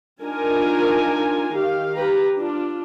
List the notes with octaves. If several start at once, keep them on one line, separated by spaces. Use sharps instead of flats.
D4 D#4 F4 A#4 G#5 A#5
D#3 G4 F5
G4 B4 A#5
D4 F4